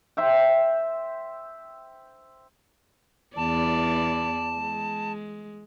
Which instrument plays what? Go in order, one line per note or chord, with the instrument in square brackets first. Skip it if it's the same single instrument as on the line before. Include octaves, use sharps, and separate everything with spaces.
[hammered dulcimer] C5 E5 G5
[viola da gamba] E2 E3 D5 [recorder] A5
[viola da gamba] G#3